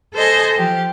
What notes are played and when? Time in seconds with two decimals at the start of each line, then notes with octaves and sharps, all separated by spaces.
0.14 A4 C5 D#5 G#5
0.55 F3 G4